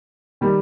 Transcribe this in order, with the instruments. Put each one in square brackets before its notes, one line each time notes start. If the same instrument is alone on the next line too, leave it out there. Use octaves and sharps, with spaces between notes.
[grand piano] D#3 G3